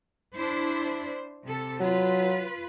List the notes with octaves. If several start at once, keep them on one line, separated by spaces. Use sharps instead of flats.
D4 E4 C5
C3 A4
F#3 F4 B4